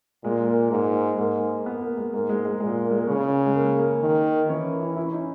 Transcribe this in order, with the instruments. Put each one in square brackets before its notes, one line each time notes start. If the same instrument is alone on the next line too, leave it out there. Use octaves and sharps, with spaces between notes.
[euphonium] A#2 [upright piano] G#3
[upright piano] A#3
[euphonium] G#2 [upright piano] A#3
[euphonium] G#2 [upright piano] A#3
[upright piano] B3
A#3
G#3
[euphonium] G#2 [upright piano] A#3
[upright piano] G#3
G#3
[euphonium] A#2 [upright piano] G#3
[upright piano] A#3
G#3
A#3
[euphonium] C#3 [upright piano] C#4
[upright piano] G#3
A#3
A#3
[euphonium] D#3
[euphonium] E3 [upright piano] C#4
[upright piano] E4
E4
C#4
D#4